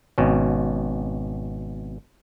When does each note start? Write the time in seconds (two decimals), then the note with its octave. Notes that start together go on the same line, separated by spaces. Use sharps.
0.18 G#1 B2 C#4